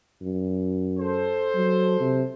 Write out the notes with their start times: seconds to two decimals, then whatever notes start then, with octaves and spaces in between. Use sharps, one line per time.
0.21 F#2
0.98 A4 C5
1.55 F#3
2.00 C3